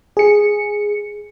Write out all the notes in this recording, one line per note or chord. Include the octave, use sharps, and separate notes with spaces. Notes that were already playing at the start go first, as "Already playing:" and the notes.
G#4 C#7